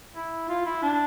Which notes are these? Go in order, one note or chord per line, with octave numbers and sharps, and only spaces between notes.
E4
F4
E4
D4